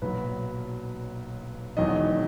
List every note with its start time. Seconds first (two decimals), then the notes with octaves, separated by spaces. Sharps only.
0.02 B1 A#2 F#3 B4
1.77 E1 E2 D#3 F#3 D#5